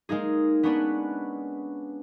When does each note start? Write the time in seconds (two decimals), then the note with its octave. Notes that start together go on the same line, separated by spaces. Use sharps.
0.09 G#3 A#3 D#4 G#4
0.63 B3 C#4 D4 B4